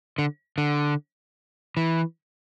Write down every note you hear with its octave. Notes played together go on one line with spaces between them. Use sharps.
D3
D3
E3